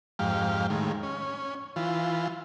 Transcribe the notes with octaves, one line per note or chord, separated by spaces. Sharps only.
F2 G#2 G4 F5
A2 D#3 G#3
C#4
E3 F4